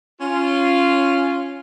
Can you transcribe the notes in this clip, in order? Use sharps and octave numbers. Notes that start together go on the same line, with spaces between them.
C#4 F4